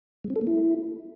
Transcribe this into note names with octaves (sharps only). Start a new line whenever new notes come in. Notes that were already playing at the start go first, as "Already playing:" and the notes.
G#3
C4
A4
A#3
E4